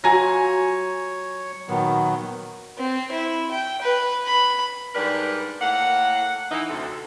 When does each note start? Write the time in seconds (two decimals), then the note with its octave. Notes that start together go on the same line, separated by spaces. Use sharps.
0.04 F#3 F4 F#4 C#5 G#5 A#5 A#6
1.69 A#2 D#3 F#3 B3
2.78 C4
3.11 E4
3.51 G5
3.82 B4
4.26 B5
4.95 G#2 G3 D4 A#4 B4
5.61 A2 A#3 F#5
6.52 E3 D#4
6.70 D2 C3 C4 A4